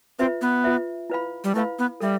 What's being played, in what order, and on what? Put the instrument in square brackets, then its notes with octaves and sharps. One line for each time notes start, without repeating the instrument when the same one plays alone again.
[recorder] C4 [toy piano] F4 B4 E5
[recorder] B3
[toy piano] F4 B4 E5
E4 B4 F5 B5
[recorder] G3
[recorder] A3 [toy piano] E4 B4 F5 B5
[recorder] B3
[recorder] G3 [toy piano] A4 E5